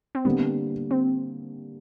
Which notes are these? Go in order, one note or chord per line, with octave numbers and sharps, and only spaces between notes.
C4
D3 G3 A#3 B3 D4 G4
C4